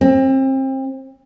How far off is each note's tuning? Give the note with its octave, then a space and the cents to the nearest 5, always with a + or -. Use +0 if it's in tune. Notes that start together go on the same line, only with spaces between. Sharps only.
C4 +30